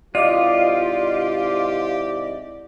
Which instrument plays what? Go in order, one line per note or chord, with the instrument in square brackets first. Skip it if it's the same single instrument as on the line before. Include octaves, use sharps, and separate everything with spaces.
[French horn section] G#2 C3 E4 [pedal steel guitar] F4 [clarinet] G4 [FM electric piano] D5 D#5 D6